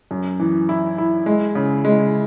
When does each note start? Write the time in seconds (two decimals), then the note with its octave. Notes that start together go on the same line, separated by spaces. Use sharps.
0.11 F#2
0.40 E3
0.69 E4
0.98 E4
1.26 G#3
1.55 C#3
1.85 G#3